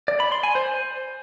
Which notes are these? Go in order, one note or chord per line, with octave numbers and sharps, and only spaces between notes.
D5
B5
C6
G#5
C5